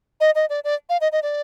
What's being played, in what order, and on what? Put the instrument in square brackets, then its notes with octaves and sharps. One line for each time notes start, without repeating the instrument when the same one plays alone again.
[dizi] D#5
D#5
D5
D5
F5
D#5
D#5
D5